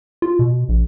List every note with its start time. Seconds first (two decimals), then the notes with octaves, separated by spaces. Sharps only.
0.22 F4
0.39 B2
0.69 A#1